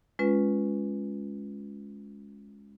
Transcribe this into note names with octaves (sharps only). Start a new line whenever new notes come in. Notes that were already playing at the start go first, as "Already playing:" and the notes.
G#3 C#4 F4 B4